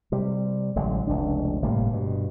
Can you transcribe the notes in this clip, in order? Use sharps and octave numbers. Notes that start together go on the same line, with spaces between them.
C3 G3
A1 D3 F#3 G#3
F1 C#2 D4
G1 A2 C3 A#3
G2 B2